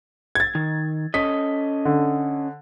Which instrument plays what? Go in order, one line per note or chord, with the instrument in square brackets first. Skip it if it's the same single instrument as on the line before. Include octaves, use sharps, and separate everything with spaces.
[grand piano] G#6 A6
[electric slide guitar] D#3
[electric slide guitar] C#4 A4 D#5 [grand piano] B6
[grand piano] D3